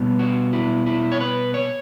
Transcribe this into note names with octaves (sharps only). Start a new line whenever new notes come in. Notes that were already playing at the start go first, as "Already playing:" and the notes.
Already playing: B2 G3 B3
F#4
E4
E4
C#5
B4
C#5